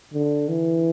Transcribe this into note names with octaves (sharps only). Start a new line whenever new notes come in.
D3
E3